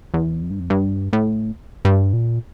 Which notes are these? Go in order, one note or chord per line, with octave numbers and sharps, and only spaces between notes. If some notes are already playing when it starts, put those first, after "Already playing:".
E2
F2
G2
F2
G2
A2
G2
A#2